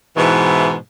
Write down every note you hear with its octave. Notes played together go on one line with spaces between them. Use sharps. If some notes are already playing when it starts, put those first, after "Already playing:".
G#2 B2 E3